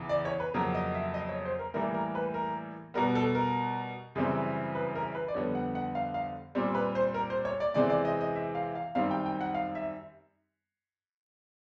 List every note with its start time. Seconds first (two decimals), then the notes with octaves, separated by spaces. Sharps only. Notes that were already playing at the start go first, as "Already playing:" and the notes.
Already playing: E2 C#3 E3
0.09 D5
0.25 C#5
0.40 B4
0.54 F2 C#3 F#3 A#3 A#4
0.74 D#5
0.94 E5
1.14 D#5
1.29 C#5
1.45 C5
1.59 A#4
1.74 A2 E3 G3 A#3 A#4
1.94 A#4
2.15 B4
2.34 A#4
2.94 B2 G3 B3 A#4
3.15 A4
3.35 A#4
4.15 F#2 C#3 E3 G3 C4
4.75 B4
4.95 A#4
5.15 B4
5.28 D5
5.34 F2 D3 G3 B3 C#5
5.55 F#5
5.75 F#5
5.95 F5
6.14 F5
6.55 A#2 G3 C4
6.75 B4
6.95 C5
7.14 A#4
7.30 C5
7.45 C#5
7.60 D5
7.74 C3 E3 G#3 C4 D5
7.90 D5
8.05 D#5
8.21 D#5
8.36 E5
8.55 F5
8.75 F5
8.95 F#2 D#3 G3 C4 F5
9.11 G5
9.26 G5
9.41 F#5
9.54 F5
9.75 E5